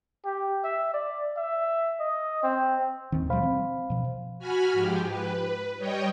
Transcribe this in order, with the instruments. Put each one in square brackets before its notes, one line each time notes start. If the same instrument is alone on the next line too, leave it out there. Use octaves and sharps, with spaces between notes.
[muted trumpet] G4
E5
D5
E5
D#5
C4
[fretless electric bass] D#2 D#3 [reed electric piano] C4
[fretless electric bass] B2 F3 G3 [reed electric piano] C5 F5 B5
[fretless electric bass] C4
B2 F3
[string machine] F#4 G#5 B5 F6
G#2 F3 G4
B4
G3 C#5 D#5 G5